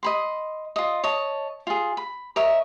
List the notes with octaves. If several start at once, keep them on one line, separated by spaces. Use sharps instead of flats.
D#5 B5 C6
F4 D#5
C#5 D#5 A5
F4 G#4
B5
A#4 C#5 D#5 E5